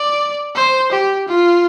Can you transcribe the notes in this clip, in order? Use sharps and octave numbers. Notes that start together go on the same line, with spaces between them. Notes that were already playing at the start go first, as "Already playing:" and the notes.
Already playing: D5
C5
G4
F4